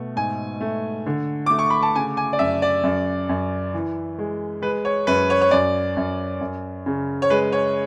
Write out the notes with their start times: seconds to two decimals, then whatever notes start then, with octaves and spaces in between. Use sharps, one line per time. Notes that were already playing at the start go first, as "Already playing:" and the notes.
Already playing: B2 A3
0.16 G#2 G#5
0.61 A3
1.06 D3
1.46 A3 D6
1.59 C#6
1.70 B5
1.83 A5
1.95 C#3 G#5
2.17 G#5
2.33 D5
2.39 F#2 E5
2.62 D5
2.84 F#2
3.29 F#2
3.74 E3
4.18 G#3
4.62 G#3 B4
4.85 C#5
5.07 F#2 B4
5.30 C#5
5.41 C#5
5.51 F#2 D5
5.97 F#2
6.41 F#2
6.86 C#3
7.22 C#5
7.30 G#3 B4
7.52 C#5